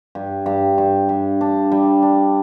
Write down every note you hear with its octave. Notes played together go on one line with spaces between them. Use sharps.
G2
G2
G2
G2
D4
G3
D4